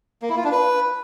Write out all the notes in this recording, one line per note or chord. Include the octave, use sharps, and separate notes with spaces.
A#3
E4
F4
D4
B4